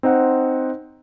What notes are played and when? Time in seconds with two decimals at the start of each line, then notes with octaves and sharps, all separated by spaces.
0.03 C4 D#4 C5 F#5